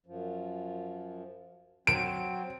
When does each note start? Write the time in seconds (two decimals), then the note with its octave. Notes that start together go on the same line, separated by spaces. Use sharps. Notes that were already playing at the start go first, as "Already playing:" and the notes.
0.06 F#2 F3
1.87 F#3 C4 D7